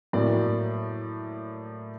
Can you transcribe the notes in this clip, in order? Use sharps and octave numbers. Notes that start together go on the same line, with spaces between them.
A2 F#3 A#3 D5